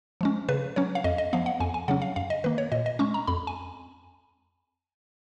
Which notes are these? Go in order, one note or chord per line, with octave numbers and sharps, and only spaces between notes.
F3 G#3 C#4
C#3 B4
F#3 C#4 C#5
F5
F2 D#5
D#5
F3 B3 F5
F#5
F2 G#5
G#5
C#3 F#3 C#4 F#5
F5
F#2 F5
D#5
D#3 A#3 B4
C#5
A#2 D#5
D#5
G#3 C#4 C#6
A#5
F2 B5
G#5